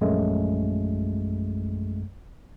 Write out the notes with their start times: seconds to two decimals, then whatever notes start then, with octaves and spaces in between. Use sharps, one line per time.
0.01 A#1 F#2 G#3 A3